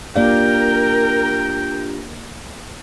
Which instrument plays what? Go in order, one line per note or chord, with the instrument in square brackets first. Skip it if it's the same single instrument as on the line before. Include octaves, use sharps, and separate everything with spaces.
[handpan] A#3 D5 F5 [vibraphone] D4 F4 G4 [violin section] A#4 [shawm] G5